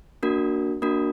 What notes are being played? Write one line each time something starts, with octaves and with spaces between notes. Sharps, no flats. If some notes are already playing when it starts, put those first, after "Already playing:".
A#3 D4 F#4 A#4
A#3 D4 F#4 A#4